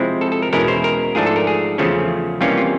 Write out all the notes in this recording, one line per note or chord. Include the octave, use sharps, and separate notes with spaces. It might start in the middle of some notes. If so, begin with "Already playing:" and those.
Already playing: C3 F3 G#3 C4 E4
A4
A4
A#4
E2 B2 G#3 C#4 E4 A#4
C5
A#4
G#2 F3 A3 D4 G#4
A4
A#4
G#4
E2 C#3 F3 A3 C#4
C3 E3 G3 A#3 C#4 F4
F4